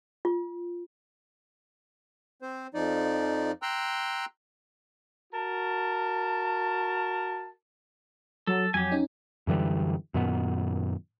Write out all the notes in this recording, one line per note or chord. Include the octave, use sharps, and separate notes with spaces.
F4
C4 C5
F2 F3 D#4 D5
G5 A#5 C6 E6 F#6
F#4 A#4 A5
F#3 A4
F2 F#3 G4 G#5
C#4 D#4
F#2 D3 E3 G3
F#2 A#2 D#3 B3